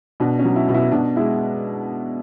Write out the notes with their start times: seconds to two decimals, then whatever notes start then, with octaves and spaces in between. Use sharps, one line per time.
0.20 B2 D4
0.39 C#4
0.45 F#3
0.56 E4
0.69 B2
0.74 E4
0.92 B2 D4
1.16 G#3 E4